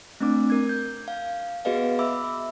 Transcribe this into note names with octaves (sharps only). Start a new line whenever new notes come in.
A3 C4 D4 D6
A#4 G#6
G6
F5
B3 F#4 G#4 B4 D#5 F5
E5 B5 D6 E6